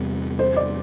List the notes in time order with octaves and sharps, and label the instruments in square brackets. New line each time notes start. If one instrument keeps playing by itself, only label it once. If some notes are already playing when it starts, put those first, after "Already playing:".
Already playing: [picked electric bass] E2 C3 G3
[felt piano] C5
D5